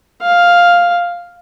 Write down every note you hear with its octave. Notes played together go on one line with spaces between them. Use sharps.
F5